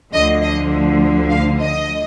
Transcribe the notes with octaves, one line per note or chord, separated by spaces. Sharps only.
D2 D3 F3 D#5
D#5
F5
D#5